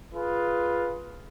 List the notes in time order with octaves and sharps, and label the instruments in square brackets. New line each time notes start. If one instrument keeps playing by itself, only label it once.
[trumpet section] F4 G#4 B4